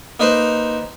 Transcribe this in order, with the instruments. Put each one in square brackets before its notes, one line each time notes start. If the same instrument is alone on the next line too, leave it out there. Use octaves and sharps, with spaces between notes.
[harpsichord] A#3 D#4 B4 C5